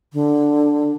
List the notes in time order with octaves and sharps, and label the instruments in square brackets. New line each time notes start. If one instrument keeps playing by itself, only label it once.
[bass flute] D3